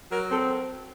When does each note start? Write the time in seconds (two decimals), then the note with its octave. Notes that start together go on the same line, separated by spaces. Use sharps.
0.10 F#3 A#4
0.29 C4 A4